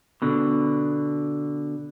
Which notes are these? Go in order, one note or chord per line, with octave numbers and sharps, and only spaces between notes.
B2 D3